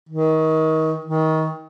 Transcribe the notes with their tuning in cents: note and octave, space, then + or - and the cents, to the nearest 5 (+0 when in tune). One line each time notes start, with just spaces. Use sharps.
D#3 +30
D#3 +25